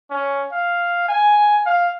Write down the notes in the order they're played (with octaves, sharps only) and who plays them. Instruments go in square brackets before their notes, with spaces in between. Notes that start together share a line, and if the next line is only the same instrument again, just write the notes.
[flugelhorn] C#4
F5
G#5
F5